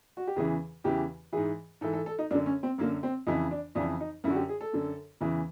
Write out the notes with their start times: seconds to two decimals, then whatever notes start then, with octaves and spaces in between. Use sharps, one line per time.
0.17 F#4
0.27 G4
0.36 E2 C#3 E3 G#4
0.84 E2 C#3 E3 G4
1.33 G#2 E3 G#4
1.81 G#2 E3 A4
1.93 A4
2.06 A4
2.19 D#4
2.31 F#2 D3 D4
2.46 C#4
2.63 C4
2.78 F#2 D3 A#3
3.03 C4
3.27 F2 C#3 E3 D#4
3.51 D4
3.75 F2 C#3 E3 D4
4.00 D#4
4.24 F#2 E4
4.27 D3 F#4
4.36 G4
4.49 G#4
4.61 A4
4.73 F#2 D3
5.21 E2 C#3 E3